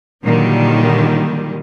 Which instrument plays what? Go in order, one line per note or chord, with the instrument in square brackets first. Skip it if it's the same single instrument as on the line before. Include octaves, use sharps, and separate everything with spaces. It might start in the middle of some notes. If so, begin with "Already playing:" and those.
[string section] A#2 D3 D#3 F#3 G3